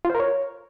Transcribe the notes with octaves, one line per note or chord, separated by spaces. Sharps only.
F4
C5
A#4
C#5